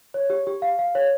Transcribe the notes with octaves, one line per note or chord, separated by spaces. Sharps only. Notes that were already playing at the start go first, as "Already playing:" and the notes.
C#5
G4
G4
F5
F5
C#5